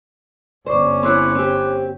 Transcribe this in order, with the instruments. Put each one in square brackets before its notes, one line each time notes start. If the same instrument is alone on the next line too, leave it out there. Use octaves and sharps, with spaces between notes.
[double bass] G1 C#4 [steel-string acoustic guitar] C5 [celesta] D5 C#6 D6
[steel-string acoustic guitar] C4 E4 C#5 [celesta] C6 D6 F#6
[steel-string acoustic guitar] C4 G4